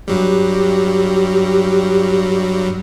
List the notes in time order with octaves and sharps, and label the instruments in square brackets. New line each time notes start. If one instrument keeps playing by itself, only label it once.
[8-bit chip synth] G2 F#3 G3 [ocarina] G4